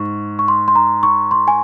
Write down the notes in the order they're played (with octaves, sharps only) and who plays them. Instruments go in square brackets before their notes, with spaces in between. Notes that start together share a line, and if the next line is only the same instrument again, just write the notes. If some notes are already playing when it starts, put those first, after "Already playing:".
Already playing: [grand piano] G#2 [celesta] C#6
[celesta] C#6
C6
C6
A#5
C#6
C6
G#5